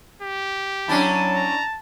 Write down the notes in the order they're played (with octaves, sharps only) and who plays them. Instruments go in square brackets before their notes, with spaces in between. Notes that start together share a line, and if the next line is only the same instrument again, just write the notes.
[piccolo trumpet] G4
[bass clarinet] F#3 [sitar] C#4 D4 E4 [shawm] A5
[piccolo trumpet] A#5